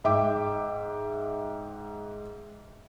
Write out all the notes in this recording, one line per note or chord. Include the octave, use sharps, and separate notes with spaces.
G#2 E5 G5 D6